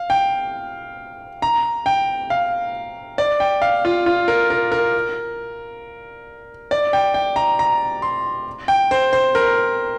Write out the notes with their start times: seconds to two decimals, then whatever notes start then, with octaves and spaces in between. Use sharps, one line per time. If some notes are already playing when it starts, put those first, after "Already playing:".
Already playing: F5
0.10 G5
1.42 A#5
1.86 G5
2.30 F5
3.18 D5
3.40 G5
3.62 F5
3.85 F4
4.06 F4
4.28 A#4
4.50 A#4
4.72 A#4
6.71 D5
6.93 G5
7.14 G5
7.36 A#5
7.59 A#5
8.02 C6
8.68 G5
8.91 C5
9.13 C5
9.35 A#4